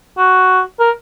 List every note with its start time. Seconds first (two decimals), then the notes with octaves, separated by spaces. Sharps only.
0.18 F#4
0.79 A#4